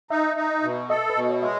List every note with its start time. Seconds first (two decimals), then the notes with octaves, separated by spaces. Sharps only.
0.10 D#4 E5
0.37 D#4
0.63 B2
0.90 A4 D#5
1.10 B4
1.16 B2
1.29 C#5
1.42 G#3 E5